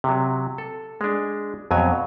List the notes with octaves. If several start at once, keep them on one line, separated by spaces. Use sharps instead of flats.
C3 F#3
A4
G#3 D4
F2 B2 F#3 G#5